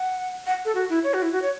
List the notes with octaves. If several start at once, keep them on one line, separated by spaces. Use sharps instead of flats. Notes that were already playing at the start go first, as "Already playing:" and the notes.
Already playing: F#5
F#5
A4
F#4
E4
C#5
F#4
E4
F#4
C#5